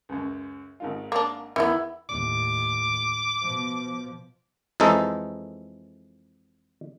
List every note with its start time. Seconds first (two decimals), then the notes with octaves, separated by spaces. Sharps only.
0.09 C#2 F#2
0.80 G#1 D#3 F4
1.12 A#3 D4
1.56 E2 D#3 B3 E4
2.09 D#2 A2 D6
3.42 B2 F3
4.80 F2 E3 G#3 D#4 A4